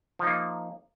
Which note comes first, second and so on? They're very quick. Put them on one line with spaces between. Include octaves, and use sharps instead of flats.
F3 D#4 A#3